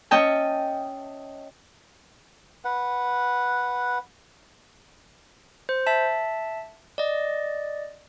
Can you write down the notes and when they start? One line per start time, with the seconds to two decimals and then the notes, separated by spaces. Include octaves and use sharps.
0.11 C#4 D#5 E5 G5 A5
2.65 B4 F#5
5.69 C5
5.87 E5 A5
6.98 D5 D#5